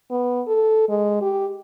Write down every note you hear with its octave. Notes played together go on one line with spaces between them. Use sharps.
B3
A4
G#3
G4